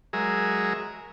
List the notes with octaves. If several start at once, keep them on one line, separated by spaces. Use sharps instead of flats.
F#3 G#3 G#4 A#4 E5